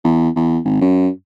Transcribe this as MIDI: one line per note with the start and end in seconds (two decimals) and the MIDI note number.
0.04 0.29 40
0.36 0.59 40
0.65 0.77 32
0.81 1.09 42